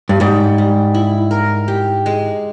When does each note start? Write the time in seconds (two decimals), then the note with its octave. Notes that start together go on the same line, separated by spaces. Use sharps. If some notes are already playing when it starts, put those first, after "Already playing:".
0.09 G2
0.20 G#2 G3
0.58 G3
0.94 E4
1.31 A#4
1.68 G4
2.06 G#3